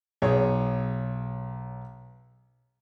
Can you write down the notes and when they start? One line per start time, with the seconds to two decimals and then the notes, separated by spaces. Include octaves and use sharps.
0.22 B1 G#4 C#5